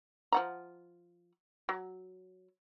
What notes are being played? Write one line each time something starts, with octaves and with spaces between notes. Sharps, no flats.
F3 F#5 A#5
F#3